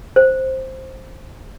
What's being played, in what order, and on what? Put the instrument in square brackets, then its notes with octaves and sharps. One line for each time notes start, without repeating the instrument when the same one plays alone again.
[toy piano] C5